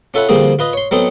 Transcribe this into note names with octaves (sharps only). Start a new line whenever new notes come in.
C#4 F4 A4 E5 F#5 B5
D3 F3 G3 A#3 C4 G#4
F4 B4 D#5
C#5 C6
F#3 B3 C4 D#4 A4 C5